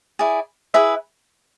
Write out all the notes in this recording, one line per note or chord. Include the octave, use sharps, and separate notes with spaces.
E4 G#4 D5
E4 G#4 B4 E5